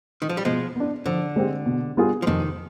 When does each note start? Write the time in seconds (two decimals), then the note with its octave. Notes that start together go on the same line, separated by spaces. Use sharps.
0.22 D#3
0.29 F3
0.37 G3
0.45 B2 F3 G#3
0.76 B3 D4
1.06 D3 F3
1.36 G#3 C4 G4
1.66 B2
1.97 G3 B3 F4 G#4
2.22 F3
2.27 F2 C3 D#3